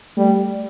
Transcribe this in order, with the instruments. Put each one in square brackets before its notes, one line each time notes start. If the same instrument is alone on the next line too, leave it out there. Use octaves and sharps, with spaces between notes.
[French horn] G3 [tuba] A3